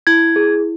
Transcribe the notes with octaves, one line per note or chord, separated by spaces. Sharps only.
E4 G#6
G#4